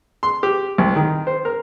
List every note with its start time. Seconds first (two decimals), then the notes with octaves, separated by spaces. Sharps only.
0.23 C6
0.43 G4
0.78 C2
0.96 D#3
1.27 C5
1.45 A#4